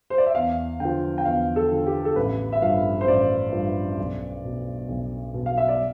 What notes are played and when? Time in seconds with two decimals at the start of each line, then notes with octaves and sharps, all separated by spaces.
0.10 C5
0.18 D5
0.26 E5
0.35 E2 F5
0.80 D3 F3 G5
1.18 G5
1.25 E2 F5
1.56 A4
1.71 D3 F3
1.86 G4
2.05 A4
2.16 A1 B4
2.52 E5
2.62 G2 F3 F5
3.01 C5
3.07 A1 D5
3.52 G2 F3
3.98 B1
4.44 B2
4.88 B1
5.34 B2
5.46 F5
5.57 E5
5.68 D5